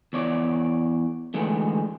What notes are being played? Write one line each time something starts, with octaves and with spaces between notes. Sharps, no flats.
E2 C#5 D5
D3 E3 G#3 A3